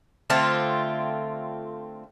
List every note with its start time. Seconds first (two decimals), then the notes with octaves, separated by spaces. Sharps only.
0.30 D3 A3 C4 F4